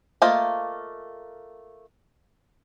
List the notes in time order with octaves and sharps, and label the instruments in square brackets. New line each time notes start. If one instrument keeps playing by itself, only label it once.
[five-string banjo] A3 A#3 F4 C5 D#5